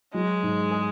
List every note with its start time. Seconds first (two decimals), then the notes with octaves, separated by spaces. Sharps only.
0.14 F#3 G#3
0.43 G#2
0.71 G#4